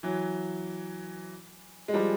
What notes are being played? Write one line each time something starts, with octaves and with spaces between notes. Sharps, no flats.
E3 F#3
G#3
F3 G3